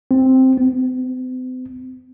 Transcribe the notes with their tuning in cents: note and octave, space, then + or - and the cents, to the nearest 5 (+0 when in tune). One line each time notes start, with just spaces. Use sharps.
C4 +0
C4 -45